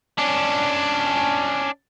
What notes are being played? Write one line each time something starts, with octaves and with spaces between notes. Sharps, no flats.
C#4 D4